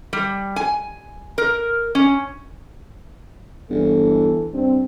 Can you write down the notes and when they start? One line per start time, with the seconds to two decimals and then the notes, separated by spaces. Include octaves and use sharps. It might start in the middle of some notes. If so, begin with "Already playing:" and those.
0.13 G3
0.56 G#5
1.38 A#4
1.95 C#4
3.70 G1 E3 A4
4.53 G2 C4